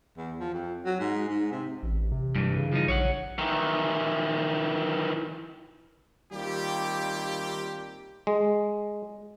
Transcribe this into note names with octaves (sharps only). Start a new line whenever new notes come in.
E2
F3
F2
F#3
G#2
G#2
C3
A1
C3
G2 E3
C#3
F3 D#4
A#1 C#5 F5 F#5
D#3 E3
D#3 G3 A#3 C4 F4 G4
G#3